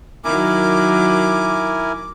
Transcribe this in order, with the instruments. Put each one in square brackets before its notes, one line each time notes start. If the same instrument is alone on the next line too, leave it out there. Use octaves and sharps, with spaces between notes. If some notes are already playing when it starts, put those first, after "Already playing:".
[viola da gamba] D#3 F#3 [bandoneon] E4 A#4 G#5 [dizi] D6